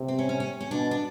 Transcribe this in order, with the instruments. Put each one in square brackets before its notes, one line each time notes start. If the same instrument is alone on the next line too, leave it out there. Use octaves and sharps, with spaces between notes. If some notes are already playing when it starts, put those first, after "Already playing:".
Already playing: [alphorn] C3
[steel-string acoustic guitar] C4
C#4
C#4
C#4
C#4
[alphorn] B2 [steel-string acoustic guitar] D4
[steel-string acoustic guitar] D4